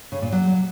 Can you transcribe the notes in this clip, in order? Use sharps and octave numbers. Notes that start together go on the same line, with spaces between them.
C#3
A#2
F#3